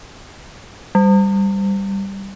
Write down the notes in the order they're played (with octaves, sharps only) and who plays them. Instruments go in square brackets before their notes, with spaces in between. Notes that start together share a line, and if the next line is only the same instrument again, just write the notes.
[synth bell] G3